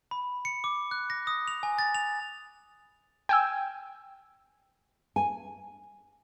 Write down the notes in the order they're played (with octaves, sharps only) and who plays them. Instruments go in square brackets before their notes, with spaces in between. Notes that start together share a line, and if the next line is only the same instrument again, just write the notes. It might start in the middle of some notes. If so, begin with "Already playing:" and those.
[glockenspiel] B5
C#7
D6
F#6
A#6
D#6
F7
G#5
A6
F7
[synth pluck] G5 G#5 E6
[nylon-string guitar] G#5